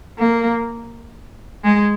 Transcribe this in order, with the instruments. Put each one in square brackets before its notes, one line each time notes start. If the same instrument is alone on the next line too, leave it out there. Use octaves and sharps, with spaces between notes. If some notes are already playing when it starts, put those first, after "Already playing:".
[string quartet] A#3
G#3